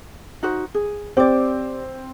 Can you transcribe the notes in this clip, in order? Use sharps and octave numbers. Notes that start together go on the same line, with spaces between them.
D#4 F#4 C5
G#4
C4 G4 D5